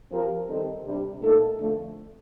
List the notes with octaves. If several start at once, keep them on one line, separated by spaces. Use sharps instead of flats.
F3 C4 G4 A#4
D#3 G3 C4 D#4 A4
C3 G3 D4
A#2 A3 D#4 A4
F2 D3 A3